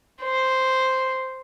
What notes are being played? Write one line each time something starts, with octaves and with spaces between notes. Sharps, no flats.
C5